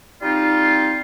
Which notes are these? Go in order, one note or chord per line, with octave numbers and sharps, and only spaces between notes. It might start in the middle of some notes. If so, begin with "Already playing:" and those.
G3 C4 D#4 F4